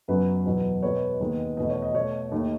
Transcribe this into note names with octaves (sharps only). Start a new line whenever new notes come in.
F#2 C#3 F#3 B3 B4
E2 B2 F#3 B3
B2 G#3 B3 C#5
D#2 D#3 G#3 B3
E2 B2 A3 D#5
C#5
D#5
B2 A3 C#5
D#2 D#3 A3